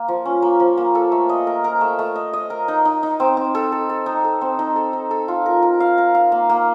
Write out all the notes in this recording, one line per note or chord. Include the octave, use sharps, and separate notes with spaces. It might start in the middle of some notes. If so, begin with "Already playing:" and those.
Already playing: A#3
F3
C#4
A#3
F3
A#3
A4
A3
D#5
A#4
A#4
A3
A3
D#5
D#5
A#4
D#4
D#4
D#4
C4
C4
A4
A4
A4
D#4
A4
C4
D#4
A4
D#4
A4
F4
A#4
A#4
F5
A#4
F5
A#3
A#3